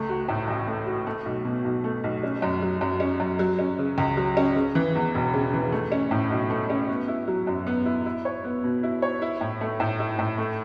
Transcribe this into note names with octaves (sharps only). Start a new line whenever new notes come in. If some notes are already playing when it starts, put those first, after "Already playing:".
Already playing: C#2 A3
F#4
A2
A1
A3
F#4
A3
B1
B2
B1
A3
B1
C#4
F#2
F#3
F#2
C#4
F#2
F#3
C#4
C#3
C#2
F#3
C#4
C#3
E3
E2
E1
C#3
E3
A3
C#4
A2
B1
A3
C#4
B3
E4
F#3
F#2
B3
E4
E4
C#5
B3
B2
E4
C#5
E4
A2
A3
A2
E4
A2
A3